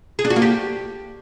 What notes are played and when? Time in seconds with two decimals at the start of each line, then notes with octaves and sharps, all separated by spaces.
0.19 G#4
0.25 D4
0.30 F#4
0.36 A#3
0.42 G4